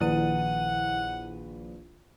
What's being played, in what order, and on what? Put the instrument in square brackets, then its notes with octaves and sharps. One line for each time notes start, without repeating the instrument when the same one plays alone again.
[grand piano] A#1 B4 [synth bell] D#3 E4 D#7 [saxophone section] F#5